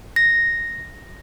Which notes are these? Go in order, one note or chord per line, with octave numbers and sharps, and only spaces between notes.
A#6